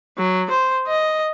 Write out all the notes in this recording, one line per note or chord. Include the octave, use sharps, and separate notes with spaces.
F#3
C5
D#5